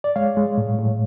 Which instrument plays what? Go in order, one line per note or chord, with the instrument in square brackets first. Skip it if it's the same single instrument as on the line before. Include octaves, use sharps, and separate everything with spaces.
[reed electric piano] D5
G#3 C#5 F5
G#3
A2
A2